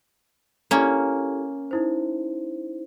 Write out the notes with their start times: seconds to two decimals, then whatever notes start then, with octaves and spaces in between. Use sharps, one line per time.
0.71 A#3 C#4 E4 G4 A4
1.71 D#4 E4 C5